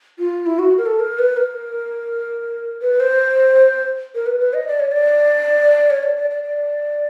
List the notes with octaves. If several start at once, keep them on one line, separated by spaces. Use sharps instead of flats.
F4
E4
F#4
A#4
A4
A#4
B4
A#4
B4
C5
A#4
B4
B4
D#5
D5
C#5
D5
C#5
D5
D5
D5
D5